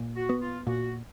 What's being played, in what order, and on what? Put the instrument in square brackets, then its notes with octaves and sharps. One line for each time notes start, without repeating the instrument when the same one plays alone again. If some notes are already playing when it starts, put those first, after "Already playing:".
Already playing: [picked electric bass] A#2
[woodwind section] F#4
[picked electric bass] B3
[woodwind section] F4
[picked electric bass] A#2 [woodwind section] F#4